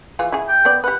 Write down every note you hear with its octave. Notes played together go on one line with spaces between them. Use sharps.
E3 F4 G#4
E4 G#4
G5
B3 D5
G4 B4 F#5